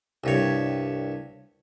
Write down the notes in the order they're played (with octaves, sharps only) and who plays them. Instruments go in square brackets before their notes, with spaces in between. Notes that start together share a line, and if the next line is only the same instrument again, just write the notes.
[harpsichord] C2 G2 C#5